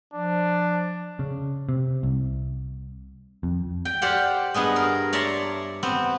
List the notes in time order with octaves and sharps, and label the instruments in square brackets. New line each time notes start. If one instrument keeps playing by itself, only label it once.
[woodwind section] F3 [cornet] D4
[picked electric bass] C#3
C3
C2
F2
[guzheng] G5
G4 C5 D5 F5 F#5
G2 B3 G#4 D#5
A#4
C#5 D5 E5 A5 A#5 C6
B3 C4